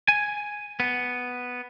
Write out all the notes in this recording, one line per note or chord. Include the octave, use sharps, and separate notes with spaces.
G#5
B3